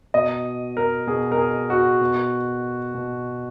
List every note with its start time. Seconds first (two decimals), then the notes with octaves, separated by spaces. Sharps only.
0.14 B2 D#5
0.77 A#4
1.07 B2 G#4
1.32 A#4
1.38 G#4
1.70 F#4
2.01 B2
2.95 B2